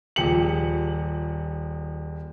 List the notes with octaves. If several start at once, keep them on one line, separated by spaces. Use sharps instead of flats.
D#1 F3 G4 G#4 C#7 F#7